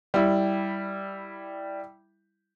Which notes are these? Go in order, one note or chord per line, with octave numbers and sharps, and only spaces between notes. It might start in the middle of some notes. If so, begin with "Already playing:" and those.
G3 E4